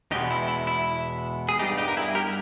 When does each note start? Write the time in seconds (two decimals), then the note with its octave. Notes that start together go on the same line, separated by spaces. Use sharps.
0.11 E2 B2 G#3 B3 D#4 G4
0.31 E4
0.48 E4
0.67 E4
1.49 G#4
1.59 G2 G3 B3 D#4 G4
1.78 D#4 G4
1.88 A#4
1.97 E4 G#4
2.15 G4 A#4